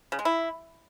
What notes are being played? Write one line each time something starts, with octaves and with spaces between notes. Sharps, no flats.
C#3
G#3
E4